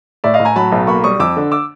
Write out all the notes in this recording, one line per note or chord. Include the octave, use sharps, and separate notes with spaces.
A2 D5 E5
D#5 F5
A2
G#5 A#5
F#3 A5 B5
B1
A#3 B5 C#6
G3 C#6 D#6
F2 D6 E6
D3
D6 E6